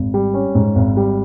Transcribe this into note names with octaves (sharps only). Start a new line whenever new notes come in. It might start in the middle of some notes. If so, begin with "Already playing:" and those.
Already playing: G#1
G3
C#4
G#2
G#1
G3